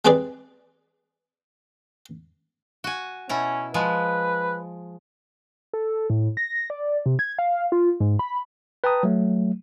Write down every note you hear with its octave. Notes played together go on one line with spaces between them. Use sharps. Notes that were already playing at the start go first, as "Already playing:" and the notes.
G3 G#3 C4 G#4 B4 D5
F#4 G#5
B2 C#4 E4 A#5
F3 G#3 B4
A4
A2
A#6
D5
C3
G#6
F5
F4
G#2
B5
B4 G5 A5 A#5 D#6
F#3 A3